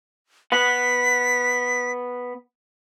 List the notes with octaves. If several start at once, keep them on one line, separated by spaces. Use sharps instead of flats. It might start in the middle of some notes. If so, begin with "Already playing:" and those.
B3 F#5 B6